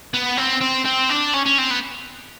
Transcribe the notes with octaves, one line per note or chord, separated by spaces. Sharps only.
B3
C4
C4
C4
D4
C#4
C#4
C4
B3